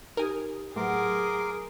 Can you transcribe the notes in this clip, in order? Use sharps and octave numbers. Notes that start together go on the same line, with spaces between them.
D#4 G4 A#4 G#5 D#6
A2 F#3 G#4 A#4 B4 F#5 C6 D6